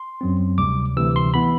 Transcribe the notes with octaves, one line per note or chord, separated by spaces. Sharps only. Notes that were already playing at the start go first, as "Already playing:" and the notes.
Already playing: C6
F#2 F#3 C4
D2 C3 G3 D6
D2 C3 E3 E6
C6
E3 B3 B5